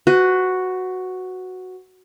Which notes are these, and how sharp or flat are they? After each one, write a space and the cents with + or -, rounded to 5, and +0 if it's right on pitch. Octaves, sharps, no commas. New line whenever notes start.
F#4 +0 B4 +30